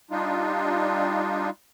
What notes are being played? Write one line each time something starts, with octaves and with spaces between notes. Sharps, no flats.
G3 D4 D#4 F4